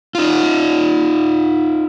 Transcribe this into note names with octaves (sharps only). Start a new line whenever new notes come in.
D#4 F4